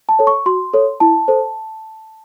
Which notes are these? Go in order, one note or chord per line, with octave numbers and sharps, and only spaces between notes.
A5
A4 C#5
C#6
F#4 C6
A4 C#5
E4 A5
A4 C5